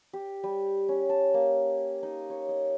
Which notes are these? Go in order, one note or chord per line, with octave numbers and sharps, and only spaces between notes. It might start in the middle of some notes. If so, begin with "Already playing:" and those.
G4
G3
C#4
A5
A#3
D#4
C#5
D#5